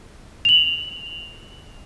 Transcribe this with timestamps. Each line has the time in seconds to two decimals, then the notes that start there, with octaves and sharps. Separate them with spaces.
0.45 F7 F#7